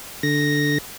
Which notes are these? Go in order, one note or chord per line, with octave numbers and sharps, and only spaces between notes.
D3 A#6